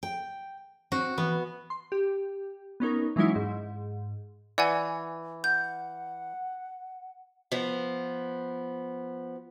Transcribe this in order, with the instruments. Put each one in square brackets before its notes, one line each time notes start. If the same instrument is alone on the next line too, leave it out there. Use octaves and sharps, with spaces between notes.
[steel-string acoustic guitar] G5
[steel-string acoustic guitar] C4 [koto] F#4
[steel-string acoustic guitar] E3 [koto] B3
[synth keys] C6
G4
B3 C#4 D#4 A#4
E3 F#3 G#3 C#4 D#4 E4
G#2
[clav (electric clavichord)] E3 [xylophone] D5 F#5 G#5
[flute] F#5 [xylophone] G6
[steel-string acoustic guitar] F3 B3